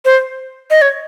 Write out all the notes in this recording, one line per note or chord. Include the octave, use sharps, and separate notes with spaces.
C5
D#5
C#5